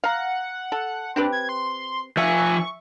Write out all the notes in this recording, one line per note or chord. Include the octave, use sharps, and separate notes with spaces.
F5 F#5 A#5
A4
C4 D4 G4 B4
G#6
C6
F3 E5 G#5 C#6